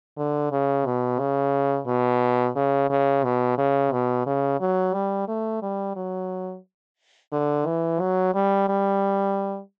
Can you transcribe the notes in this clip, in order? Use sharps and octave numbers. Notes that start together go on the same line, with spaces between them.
D3
C#3
B2
C#3
B2
C#3
C#3
B2
C#3
B2
C#3
F#3
G3
A3
G3
F#3
D3
E3
F#3
G3
G3